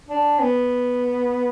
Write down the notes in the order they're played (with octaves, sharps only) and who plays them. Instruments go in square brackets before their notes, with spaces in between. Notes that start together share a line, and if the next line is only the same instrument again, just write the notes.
[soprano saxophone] D4
B3